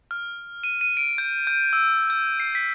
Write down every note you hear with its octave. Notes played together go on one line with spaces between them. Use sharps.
F6
D#7
D#7
D7
G6
G6
E6
G6
C7
B6